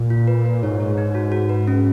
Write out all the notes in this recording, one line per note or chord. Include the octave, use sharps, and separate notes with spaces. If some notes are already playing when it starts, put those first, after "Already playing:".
Already playing: A#2
F4
B4
B4
G#2 C#5
C#5
D#4
F#4
F#4
B4
C#4